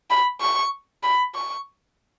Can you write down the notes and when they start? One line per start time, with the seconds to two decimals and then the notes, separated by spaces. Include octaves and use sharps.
0.10 B5
0.41 C#6
1.03 B5
1.34 C#6